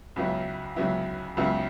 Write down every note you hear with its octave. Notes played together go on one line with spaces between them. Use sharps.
C#2 C#3 F#3 B3 E4
C#2 C#3 F#3 B3 E4
C#2 C#3 F#3 B3 E4